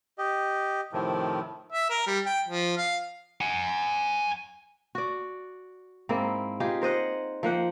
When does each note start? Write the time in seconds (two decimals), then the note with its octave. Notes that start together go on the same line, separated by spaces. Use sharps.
0.18 G4 D#5
0.93 A2 C3 D#3 F3
1.72 E5
1.90 A#4
2.07 G3
2.26 G5
2.48 F3
2.78 F5
3.41 F#5 G#5
4.95 F#4 D5
6.09 G#2 A#3 C4 E4
6.60 D#4 F4 G4 G#4
6.81 A#4 C5 D#5 F#5
7.43 F3 A#3 F#5 G5